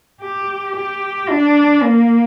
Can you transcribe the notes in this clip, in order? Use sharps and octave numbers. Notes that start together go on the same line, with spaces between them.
G4
G4
D4
A#3